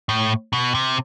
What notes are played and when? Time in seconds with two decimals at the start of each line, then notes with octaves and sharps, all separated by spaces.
0.09 A2
0.53 B2
0.75 C3